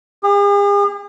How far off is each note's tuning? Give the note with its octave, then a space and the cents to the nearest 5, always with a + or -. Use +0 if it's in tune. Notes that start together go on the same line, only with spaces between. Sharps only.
G#4 -45